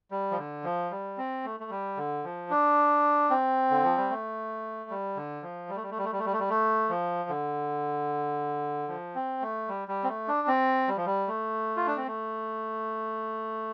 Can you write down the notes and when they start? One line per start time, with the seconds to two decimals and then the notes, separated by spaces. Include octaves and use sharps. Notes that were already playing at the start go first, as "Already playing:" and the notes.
0.11 G3
0.31 F3
0.38 D3
0.64 F3
0.91 G3
1.18 C4
1.45 A3
1.60 A3
1.71 G3
1.97 D3
2.24 F3
2.50 D4
3.30 C4
3.71 D3
3.84 F3
3.97 G3
4.10 A3
4.90 G3
5.17 D3
5.43 F3
5.69 G3
5.76 A3
5.83 G3
5.91 A3
5.98 G3
6.04 A3
6.12 G3
6.19 A3
6.25 G3
6.33 A3
6.40 G3
6.50 A3
6.89 F3
7.29 D3
8.89 F3
9.15 C4
9.42 A3
9.68 G3
9.88 G3
10.04 C4
10.09 A3
10.28 D4
10.48 C4
10.88 G3
10.97 F3
11.06 G3
11.28 A3
11.76 F4
11.87 D4
11.97 C4
12.07 A3